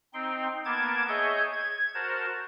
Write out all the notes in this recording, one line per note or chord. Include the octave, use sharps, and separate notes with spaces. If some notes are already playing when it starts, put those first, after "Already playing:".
C4 D#4 G5 C6
A#3 B3 A5 D6 G#6
G#4 C#5 D#5 E5 G#5 G6
G#6
F#4 A#4 C5 A5